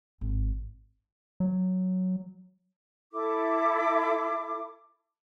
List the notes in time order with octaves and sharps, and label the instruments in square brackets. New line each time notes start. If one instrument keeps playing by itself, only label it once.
[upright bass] G#1
[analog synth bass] F#3
[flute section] E4 A4 D6